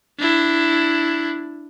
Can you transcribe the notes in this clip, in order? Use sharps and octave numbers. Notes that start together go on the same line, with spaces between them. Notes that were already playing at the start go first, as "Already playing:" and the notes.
D4 E4